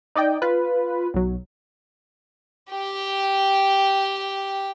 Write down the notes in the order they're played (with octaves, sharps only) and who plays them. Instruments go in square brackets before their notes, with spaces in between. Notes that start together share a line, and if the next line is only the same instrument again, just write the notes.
[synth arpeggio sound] D#4 D5 D#5 G5
F4 B4
B1 F#3
[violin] G4 G5